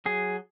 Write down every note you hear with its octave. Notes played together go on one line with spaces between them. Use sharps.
F#3 G#4